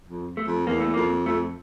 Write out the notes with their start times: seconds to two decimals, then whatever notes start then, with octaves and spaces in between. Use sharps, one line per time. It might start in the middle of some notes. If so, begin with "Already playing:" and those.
0.08 F2
0.37 A3
0.47 F2
0.67 E2 A#3
0.80 A3
0.94 F2 A#3
1.26 F2 A3